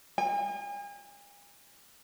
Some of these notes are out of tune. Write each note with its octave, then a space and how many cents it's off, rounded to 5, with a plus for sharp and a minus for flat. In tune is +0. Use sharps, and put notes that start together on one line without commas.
G#5 -40